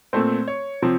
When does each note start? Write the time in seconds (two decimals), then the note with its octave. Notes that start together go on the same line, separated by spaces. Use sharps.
0.13 A#2 A3 C4 C5
0.48 C#5
0.82 C3 F3 C4